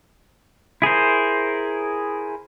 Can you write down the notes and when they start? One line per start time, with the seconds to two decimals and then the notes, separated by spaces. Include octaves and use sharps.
0.82 E4 G#4 A#4 C5